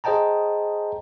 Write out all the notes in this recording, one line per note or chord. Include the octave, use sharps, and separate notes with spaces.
G#4 C5 D#5 G5 A5 A#5